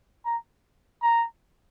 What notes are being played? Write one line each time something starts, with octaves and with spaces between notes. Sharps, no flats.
A#5
A#5